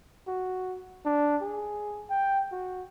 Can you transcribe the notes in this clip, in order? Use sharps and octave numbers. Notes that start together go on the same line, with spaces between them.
F#4
D4
G#4
G5
F#4